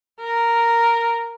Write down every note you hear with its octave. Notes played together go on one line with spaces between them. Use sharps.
A#4